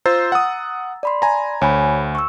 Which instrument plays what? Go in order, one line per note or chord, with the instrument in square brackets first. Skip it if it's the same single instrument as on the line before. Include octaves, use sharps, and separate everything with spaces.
[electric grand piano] F4 C5 [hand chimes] A#5 E6 A6
[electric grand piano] F#5 D#6
[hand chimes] D5 B5 C6
[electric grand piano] G#5 A#5
[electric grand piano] D2 [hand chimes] C#5 G#5 B5
[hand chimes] C#6 E6